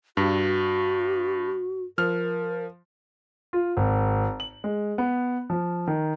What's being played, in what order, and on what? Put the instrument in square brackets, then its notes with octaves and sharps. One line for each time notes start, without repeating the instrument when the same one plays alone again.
[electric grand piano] G2 [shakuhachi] F#4
[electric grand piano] F3 F6 [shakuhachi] A#4
[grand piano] F4
G#1
F#7
G#3
B3
F3
D#3